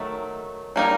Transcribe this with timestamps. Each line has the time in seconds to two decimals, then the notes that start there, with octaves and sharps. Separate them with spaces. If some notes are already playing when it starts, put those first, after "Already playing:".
Already playing: D#3 F#3 A3
0.76 G3 A#3 D#4